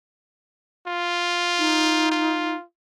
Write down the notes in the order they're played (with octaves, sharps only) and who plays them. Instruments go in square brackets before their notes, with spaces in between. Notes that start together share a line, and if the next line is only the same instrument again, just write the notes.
[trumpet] F4
[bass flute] D#4
[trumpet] F4